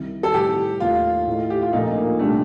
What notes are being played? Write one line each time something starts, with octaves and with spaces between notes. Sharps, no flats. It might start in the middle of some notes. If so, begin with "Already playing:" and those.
Already playing: C2 C3 D#3
A4
A2 G3 C4 D#4 G4
D#2 D#3 A3 F4
A2 A3 D#4
G4
F4
A#1 A#2 A3 D#4
A#3
C3 G3 A3 D4